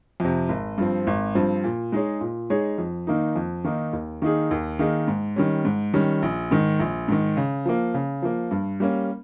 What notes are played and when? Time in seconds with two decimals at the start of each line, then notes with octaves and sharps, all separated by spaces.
0.20 F2 C3
0.49 G#1
0.78 G2 F3 C4
1.07 G#1
1.35 G2 F3 C4
1.64 A#2
1.92 G#3 D#4 G#4 C#5
2.21 A#2
2.50 G#3 D#4 G#4 C#5
2.78 F2
3.07 D#3 A#3 D#4
3.36 F2
3.64 D#3 A#3 D#4
3.93 D#2
4.22 D#3 A#3 D#4 G#4
4.51 D#2
4.79 D#3 A#3 D#4 G#4
5.08 G#2
5.36 D#3 G3 C#4
5.65 G#2
5.94 D#3 G3 C#4
6.22 A#1
6.51 G#2 D#3
6.80 A#1
7.08 G#2 D#3
7.37 C#3
7.65 F3 A#3
7.94 C#3
8.22 F3 A#3
8.51 G2
8.80 G3 A#3 C#4